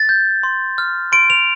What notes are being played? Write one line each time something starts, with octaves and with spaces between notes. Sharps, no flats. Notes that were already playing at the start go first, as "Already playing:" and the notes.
Already playing: A6
G6
C6
F6
C6 D7
F7